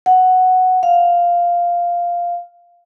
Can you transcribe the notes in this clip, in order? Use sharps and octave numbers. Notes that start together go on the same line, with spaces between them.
F#5
F5